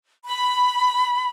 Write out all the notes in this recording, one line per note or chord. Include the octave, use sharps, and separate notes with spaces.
B5